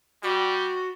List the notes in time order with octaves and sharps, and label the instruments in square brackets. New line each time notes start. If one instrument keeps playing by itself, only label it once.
[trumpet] G3 [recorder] F#4